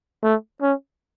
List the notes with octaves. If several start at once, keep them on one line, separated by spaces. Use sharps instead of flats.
A3
C#4